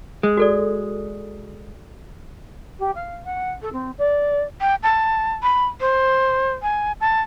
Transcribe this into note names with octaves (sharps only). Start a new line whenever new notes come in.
G#3
F#4 A4 D5
G4
F5
F#5
A4
C4
D5
G5
A5
B5
C5
G#5
A5